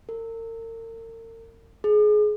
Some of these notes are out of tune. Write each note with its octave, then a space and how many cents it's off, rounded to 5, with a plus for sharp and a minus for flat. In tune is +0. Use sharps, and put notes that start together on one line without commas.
A#4 -40
G#4 +25